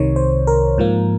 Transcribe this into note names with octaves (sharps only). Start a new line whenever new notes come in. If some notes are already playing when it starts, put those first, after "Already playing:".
Already playing: C2 C3 D#3 C#5
C5
A#4
G#2 F3 A#3